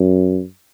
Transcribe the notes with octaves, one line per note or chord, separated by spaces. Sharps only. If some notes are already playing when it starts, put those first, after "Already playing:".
Already playing: F#2